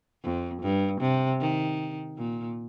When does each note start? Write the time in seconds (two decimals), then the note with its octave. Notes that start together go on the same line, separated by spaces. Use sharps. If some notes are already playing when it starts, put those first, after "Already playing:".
0.24 F2
0.62 G2
1.01 C3
1.41 D#3
2.18 A#2